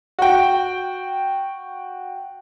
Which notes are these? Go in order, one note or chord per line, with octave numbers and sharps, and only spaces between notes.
F#4 G5